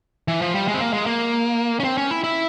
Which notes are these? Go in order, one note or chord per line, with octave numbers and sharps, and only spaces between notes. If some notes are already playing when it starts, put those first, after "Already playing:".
E3
F3
G3
G#3
C4
A#3
G#3
A#3
C#4
C4
C#4
E4
E4